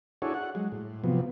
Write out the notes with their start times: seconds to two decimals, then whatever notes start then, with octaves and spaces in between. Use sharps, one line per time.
0.22 D4 E4 F#4 G#4 A4 C#5
0.34 F#5
0.55 F#3 G#3
0.72 A2
1.04 C3 F3 F#3 B3